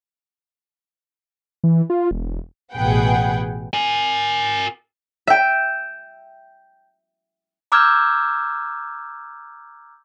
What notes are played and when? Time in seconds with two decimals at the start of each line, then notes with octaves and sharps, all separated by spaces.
1.64 E3
1.90 F4
2.11 E1
2.73 A1 B2 G#4 B4 F#5 G5
3.74 A#4 G#5
5.27 E5 G5
7.72 A#5 D6 E6 F6 G6 G#6